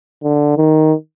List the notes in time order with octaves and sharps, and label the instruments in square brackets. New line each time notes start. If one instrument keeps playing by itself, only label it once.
[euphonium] D3
D#3